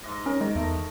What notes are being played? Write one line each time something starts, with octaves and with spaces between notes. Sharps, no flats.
G#2 D#5
C#4 A#4
D#3 G#3
E2 A3